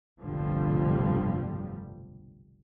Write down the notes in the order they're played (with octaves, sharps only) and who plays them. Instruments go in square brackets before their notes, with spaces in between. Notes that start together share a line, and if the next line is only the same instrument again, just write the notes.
[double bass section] F1 B1 G2 D3 F3 G3